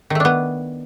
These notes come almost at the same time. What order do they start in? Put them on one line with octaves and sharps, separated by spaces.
D#3 A3 D4 B3